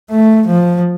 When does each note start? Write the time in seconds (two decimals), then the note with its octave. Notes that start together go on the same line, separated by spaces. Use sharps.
0.10 A3
0.47 F3